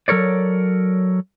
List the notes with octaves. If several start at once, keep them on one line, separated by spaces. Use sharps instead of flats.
F#3 A4 A#4 C#5 D5